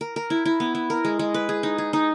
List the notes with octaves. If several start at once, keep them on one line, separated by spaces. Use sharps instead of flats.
A#4
A#4
E4
E4
B3
E4
A#4
G#3
G#3
B4
G#4
D#4
G#4
D#4